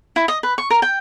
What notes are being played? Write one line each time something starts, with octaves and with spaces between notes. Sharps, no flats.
E4
D#5
B4
C#6
A#4
G5